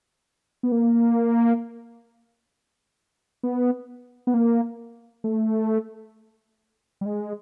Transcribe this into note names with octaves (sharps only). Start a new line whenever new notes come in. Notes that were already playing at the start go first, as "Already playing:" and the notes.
B3
A#3
B3
B3
A#3
A3
G3
G#3